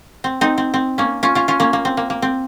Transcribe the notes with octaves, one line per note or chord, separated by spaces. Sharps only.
C4
C4 D#4
C4
C4
A#3 C#4
C#4 F4
C#4 F4
C#4 F4
A#3 C#4
A#3
C4
A#3
A#3
C4